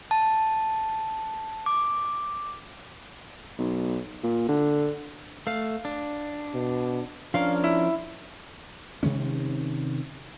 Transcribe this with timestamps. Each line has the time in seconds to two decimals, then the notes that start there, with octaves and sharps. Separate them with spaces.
0.11 A5
1.66 D6
3.58 B1
4.24 A#2
4.48 D3
5.47 A3 F5
5.85 D4
6.54 B2
7.34 F3 C#4 D4 A#4 F5
7.64 E4
9.03 C3 D#3 G#3 C#4